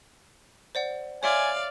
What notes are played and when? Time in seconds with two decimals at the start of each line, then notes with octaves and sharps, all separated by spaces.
0.75 C5 D5 F#5
1.23 C#5 D5 E5 F5 G#5 C6